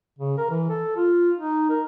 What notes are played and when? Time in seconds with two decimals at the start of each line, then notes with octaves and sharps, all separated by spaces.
0.19 C#3
0.38 A#4
0.50 E3
0.70 A4
0.96 F4
1.38 D#4
1.70 A#4